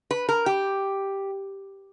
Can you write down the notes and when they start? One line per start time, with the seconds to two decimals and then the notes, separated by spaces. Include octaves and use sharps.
0.11 B4
0.29 A#4
0.46 G4